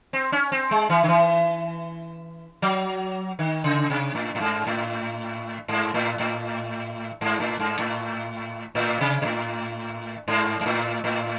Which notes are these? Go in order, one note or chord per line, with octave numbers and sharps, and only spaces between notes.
C4
C#4
C4
G#3
E3
D#3
E3
F#3
D#3
C#3
C3
A2
A2
G#2
A2
G#2
A2
A2
G#2
A2
G#2
A2
A2
C3
C3
A2
G#2
G#2
A2
A2